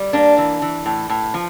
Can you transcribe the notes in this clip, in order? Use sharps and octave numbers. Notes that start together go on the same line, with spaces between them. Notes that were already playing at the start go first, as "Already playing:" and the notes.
Already playing: G3
A#3 D4
E3
E3
A2
A2
F3